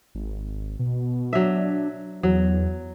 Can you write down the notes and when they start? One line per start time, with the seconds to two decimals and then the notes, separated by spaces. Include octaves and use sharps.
0.15 G#1
0.79 B2
1.33 F#3 D4 E5
2.23 E2 F#3